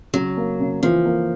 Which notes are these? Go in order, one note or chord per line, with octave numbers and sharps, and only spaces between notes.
C#3 F#3
A#3
C#3
E3 F3
A#3